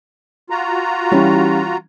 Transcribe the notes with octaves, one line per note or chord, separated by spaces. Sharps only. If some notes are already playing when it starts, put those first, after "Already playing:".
F4 F#4 A#5
E3 G3 C#4